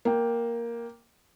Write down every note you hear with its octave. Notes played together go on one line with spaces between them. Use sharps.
A#3 G5